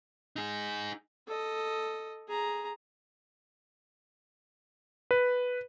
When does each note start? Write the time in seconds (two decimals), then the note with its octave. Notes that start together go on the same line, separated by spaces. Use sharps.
0.36 D#4 G#4
1.28 A4 D#5
2.28 G#4 A#5
5.11 B4